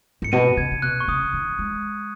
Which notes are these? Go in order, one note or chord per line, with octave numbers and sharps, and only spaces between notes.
G#2 C#7
B2 D#7
C#3 G#6
C#3
B2 F#6
C#6
C#3 D#6
D#3
G#3